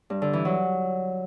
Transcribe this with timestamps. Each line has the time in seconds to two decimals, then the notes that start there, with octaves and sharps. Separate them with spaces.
0.10 G2
0.22 D3
0.33 E3
0.45 F#3